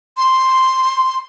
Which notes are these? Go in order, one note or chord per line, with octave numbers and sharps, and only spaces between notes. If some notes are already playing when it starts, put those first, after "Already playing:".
C6